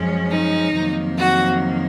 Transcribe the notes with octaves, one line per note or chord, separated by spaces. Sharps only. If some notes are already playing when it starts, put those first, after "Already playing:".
Already playing: F#2 F3 G#3 C#4
D#4
F2 C3 D#3 F#3 A#3
F#4